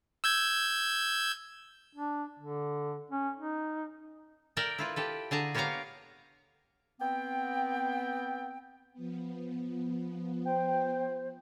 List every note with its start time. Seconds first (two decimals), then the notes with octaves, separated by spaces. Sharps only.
0.24 E6 G6 G#6
1.95 D4
2.39 D3
3.11 C#4
3.36 D#4
4.57 A#4 D5 E5 G5
4.78 E4 F4 B4
4.96 G4 A4 B4
5.31 D3 G#4 A5 A#5
5.54 A#3 B3 G4 C#5 F5 A#5
7.00 B3 C4 G5
8.93 F3 B3
10.45 C5 G5